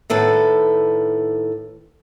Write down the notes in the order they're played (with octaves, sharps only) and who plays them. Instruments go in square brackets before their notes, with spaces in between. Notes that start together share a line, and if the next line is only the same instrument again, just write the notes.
[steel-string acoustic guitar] A2 D#3 A4 B4 F#5